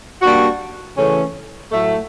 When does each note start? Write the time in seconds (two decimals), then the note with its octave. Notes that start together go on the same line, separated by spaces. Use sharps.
0.21 G3 A#3 D4 F#4
0.96 C#3 E3 A3 C#4
1.71 A2 F#3 A3